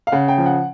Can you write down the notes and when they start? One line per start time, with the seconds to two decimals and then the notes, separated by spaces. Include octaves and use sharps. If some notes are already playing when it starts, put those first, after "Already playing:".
0.07 F5
0.12 C#3 F#5
0.28 G5
0.38 F3
0.46 F#5